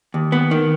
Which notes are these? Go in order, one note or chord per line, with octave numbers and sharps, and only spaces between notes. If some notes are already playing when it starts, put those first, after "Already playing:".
D#2
B3
D#3